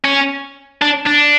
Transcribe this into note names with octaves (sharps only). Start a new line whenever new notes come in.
C#4
D4
D4